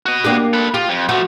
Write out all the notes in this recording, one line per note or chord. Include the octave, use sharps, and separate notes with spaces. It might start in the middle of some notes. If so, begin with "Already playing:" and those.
F#4 D#5
A#3 D4 G4
A4 B4
F4 G4
F2
F3 A3 F#4